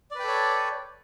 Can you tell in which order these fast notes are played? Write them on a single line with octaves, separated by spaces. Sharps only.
D5 B4 G5 A4 C#5